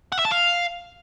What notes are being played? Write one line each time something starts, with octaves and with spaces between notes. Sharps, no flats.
F#5
E5
A5
F5